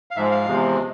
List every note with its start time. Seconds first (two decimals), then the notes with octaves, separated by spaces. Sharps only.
0.11 F5
0.16 G#2 F3 G#3 E5
0.31 F5
0.46 E2 C3 F3 G#3